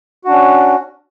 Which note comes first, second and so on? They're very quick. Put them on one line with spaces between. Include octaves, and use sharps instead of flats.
F#4 D4 C#4